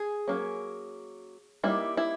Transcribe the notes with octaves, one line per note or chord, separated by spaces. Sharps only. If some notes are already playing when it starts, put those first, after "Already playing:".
Already playing: G#4
F#3 A#3 C#4
G3 A#3 D#4 E4
E4